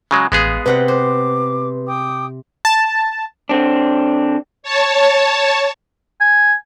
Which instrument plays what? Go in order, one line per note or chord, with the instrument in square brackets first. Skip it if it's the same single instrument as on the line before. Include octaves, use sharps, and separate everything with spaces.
[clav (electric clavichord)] C#3 F#3 G#3
[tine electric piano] A1 [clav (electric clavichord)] G#3 B3 G#4 [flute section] F5
[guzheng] C3 F#5 G5 [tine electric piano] B4 [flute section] D5
[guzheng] C5 [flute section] D6
[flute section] G5 D6 D#6
[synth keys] A5
[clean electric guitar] D3 C4 D4
[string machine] C#5 A5
[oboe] G#5